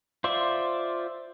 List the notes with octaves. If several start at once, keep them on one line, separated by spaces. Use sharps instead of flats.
F4 C5 D5 E5